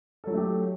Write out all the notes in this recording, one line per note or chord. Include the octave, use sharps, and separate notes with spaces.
F#3 A3 F#4 G4 A4